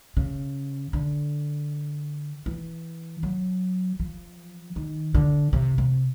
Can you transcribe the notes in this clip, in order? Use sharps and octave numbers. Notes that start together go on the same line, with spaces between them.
C#3
D3
E3
F#3
F3
D#3
D3
C3
C3